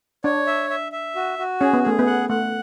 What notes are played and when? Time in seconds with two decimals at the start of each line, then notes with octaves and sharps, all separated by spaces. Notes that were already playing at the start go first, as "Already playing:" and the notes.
0.24 D4 C#5
0.47 E5
0.70 E5
0.92 E5
1.15 F#4
1.38 F#4
1.60 C#4 G#4
1.73 B3
1.83 A3 G#4
1.99 B3
2.06 F#5
2.29 A3 F#5